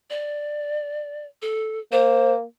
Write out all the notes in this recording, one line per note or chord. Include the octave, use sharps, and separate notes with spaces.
D5
A4
A#3 C5